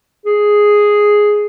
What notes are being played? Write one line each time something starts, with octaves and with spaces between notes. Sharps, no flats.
G#4